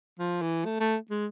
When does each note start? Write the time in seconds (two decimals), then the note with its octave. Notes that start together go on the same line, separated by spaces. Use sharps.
0.19 F3
0.42 E3
0.65 A3
0.80 A3
1.10 G#3